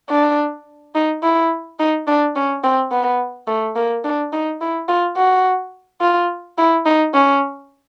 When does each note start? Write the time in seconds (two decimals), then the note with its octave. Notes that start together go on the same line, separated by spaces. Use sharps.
0.10 D4
0.95 D#4
1.23 E4
1.79 D#4
2.07 D4
2.36 C#4
2.64 C4
2.91 B3
3.48 A3
3.76 A#3
4.04 D4
4.33 D#4
4.61 E4
4.89 F4
5.17 F#4
6.01 F4
6.58 E4
6.86 D#4
7.14 C#4